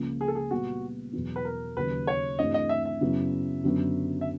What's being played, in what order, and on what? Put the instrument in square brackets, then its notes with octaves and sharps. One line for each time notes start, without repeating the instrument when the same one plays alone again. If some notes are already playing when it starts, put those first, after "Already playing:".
Already playing: [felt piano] C#2 C#3 F3 A#3
[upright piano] G#4
A4
G#4
[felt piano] A#2 G3 B3 [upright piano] F#4
[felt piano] E2 B2 F#3 B3
[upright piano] B4
A#4
[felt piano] D#2 C#3 F#3 [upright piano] B4
[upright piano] C#5
[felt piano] G2 E3 A3 C4 [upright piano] D#5
[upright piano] D#5
E5
E5
[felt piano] F#2 C#3 F#3 B3 E4
F#2 D3 F#3 B3
[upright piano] E5